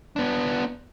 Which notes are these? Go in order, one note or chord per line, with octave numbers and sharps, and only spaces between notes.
B3 D4